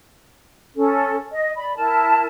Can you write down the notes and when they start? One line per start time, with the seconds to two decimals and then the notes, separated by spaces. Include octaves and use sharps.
0.76 C#4 A4
1.32 D#5
1.56 D5 B5
1.75 E4 A#4 A5